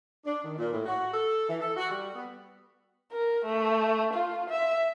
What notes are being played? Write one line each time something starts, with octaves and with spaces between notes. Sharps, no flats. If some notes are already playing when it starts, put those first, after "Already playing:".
D4
D#3
A#2
A2
F#4
A4
E3
A4
F#4
G3
B3
A#4
A3
F4
E5